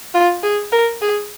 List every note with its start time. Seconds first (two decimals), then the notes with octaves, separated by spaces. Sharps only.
0.14 F4
0.43 G#4
0.72 A#4
1.01 G#4